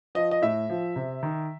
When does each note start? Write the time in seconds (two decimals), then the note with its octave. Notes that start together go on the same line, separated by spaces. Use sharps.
0.15 F3 D#5
0.31 D#5
0.42 A2 E5
0.70 F3
0.96 C3
1.23 D#3